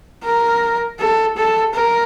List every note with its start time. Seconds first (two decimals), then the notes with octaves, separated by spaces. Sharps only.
0.24 A#4
1.00 A4
1.37 A4
1.74 A#4